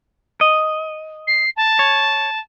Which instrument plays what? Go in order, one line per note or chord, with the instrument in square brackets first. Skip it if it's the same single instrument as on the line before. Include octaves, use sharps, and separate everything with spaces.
[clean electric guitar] D#5
[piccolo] C7
A5
[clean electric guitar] C#5